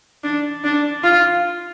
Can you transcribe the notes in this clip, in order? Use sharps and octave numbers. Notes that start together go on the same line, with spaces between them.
D4
D4
F4